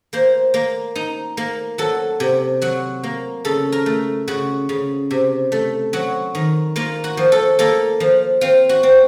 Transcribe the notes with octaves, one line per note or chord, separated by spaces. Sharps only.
A#3 C5
A#3
D#4
A#3
F#3 A4
C3
F#3 F#4
A#3
C#3 A4
A#4
A3
C#3 F#4
C#3
C3
A3
F#3 F#4
D#3
A#3 F4
F#4
F3
A4
A#3 A4
F3
C4 F4
F#4
C4